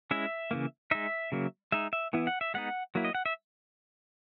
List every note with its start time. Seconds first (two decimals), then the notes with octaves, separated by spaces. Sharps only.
0.11 G#3 C#4 E4 E5
0.51 C#3 E3 A#3
0.91 G#3 D#4 E5
1.32 C#3 F#3 A#3
1.72 G#3 D#4 E5
1.93 E5
2.13 E3 B3 E4
2.27 F#5
2.41 E5
2.54 G#3 B3 D#4 F#5
2.95 F#3 A#3 E4
3.05 D#5
3.15 F#5
3.26 E5